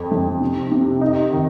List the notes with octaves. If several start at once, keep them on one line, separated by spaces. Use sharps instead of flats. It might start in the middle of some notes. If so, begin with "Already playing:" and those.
Already playing: F2
F2
C3
C3
D#4
D#3